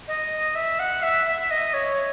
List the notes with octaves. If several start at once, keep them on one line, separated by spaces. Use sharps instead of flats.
D#5
E5
F#5
E5
E5
D#5
C#5